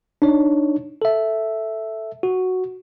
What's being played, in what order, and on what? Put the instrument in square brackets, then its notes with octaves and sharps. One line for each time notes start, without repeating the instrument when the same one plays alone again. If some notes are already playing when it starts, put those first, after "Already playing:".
[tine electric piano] D4 D#4 C#5
A4 E5
F#4